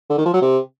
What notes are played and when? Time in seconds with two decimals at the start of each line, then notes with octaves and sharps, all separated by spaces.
0.10 D3
0.18 D#3
0.26 F3
0.34 F#3
0.42 C3